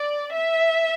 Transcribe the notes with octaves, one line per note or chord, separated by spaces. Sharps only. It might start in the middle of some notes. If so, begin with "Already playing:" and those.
Already playing: D5
E5